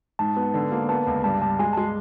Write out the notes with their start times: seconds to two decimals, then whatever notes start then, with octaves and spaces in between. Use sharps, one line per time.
0.19 G#2 A5
0.36 B3
0.54 D3
0.72 A#3
0.89 B3 A5
1.07 C#2
1.24 G2 A5
1.42 G2 A5
1.59 G#3 G#5
1.73 G#3 A5